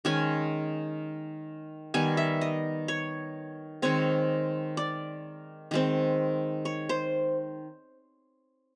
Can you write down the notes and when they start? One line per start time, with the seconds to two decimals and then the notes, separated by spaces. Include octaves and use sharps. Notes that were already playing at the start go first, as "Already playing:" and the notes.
0.05 D#3 G#3 C#4 G#5
1.94 D#3 G3 B3 G#5
2.17 E5
2.41 D#5
2.88 C#5
3.82 D#3 G#3 C4 C#5
4.77 D5
5.71 D#3 G#3 C4
6.65 C#5
6.89 C5